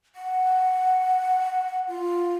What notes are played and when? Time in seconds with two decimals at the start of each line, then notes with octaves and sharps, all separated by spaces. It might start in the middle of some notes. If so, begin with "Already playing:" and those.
0.15 F#5
1.88 F4